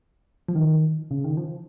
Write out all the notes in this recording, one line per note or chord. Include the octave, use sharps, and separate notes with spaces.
F3
D#3
C#3
D#3
F3